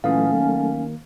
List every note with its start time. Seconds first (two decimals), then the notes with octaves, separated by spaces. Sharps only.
0.04 A#2 E3 F#3 A3 C#4 A4 F5 D#6
0.33 D#3 A#3